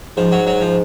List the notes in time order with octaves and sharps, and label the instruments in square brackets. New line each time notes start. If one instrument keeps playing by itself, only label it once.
[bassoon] G#2 [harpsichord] F3
[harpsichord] F#3
F#3
F3